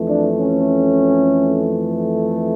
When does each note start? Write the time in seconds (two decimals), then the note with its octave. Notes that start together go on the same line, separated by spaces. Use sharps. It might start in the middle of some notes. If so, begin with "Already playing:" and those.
Already playing: F2 E3 A3
0.09 D4
0.38 C#4